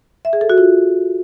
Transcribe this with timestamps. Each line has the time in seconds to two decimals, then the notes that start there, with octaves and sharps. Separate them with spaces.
0.25 E5
0.33 G#4
0.41 A4
0.50 F#4
0.58 F4